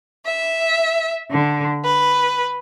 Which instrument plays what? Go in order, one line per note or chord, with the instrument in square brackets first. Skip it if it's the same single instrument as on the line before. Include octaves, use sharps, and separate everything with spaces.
[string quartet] E5
D3
B4